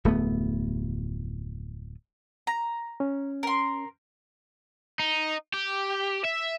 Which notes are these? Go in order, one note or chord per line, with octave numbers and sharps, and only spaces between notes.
D1 F2 A3 B3
A#5
C#4
A#4 C6
D#4
G4
E5